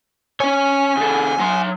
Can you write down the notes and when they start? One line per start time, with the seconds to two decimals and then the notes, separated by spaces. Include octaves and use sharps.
0.40 C#4 C#5 G#5
0.97 C#3 A4
1.40 F#3 C6